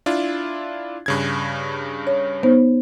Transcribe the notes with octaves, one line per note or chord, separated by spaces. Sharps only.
D4 E4 F4
G2 C#3 G#6
C#5
B3 D#4 C5